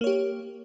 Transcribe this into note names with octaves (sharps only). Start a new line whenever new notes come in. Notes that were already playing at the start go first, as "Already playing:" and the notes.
A#3 G4 C#5